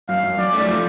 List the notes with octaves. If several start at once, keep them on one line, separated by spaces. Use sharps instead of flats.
F#2 F5
F#2
F#2 D5
A3
F3